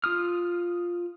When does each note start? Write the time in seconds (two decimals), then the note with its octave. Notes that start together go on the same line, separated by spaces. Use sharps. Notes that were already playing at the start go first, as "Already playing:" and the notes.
0.04 F4 D#6 F6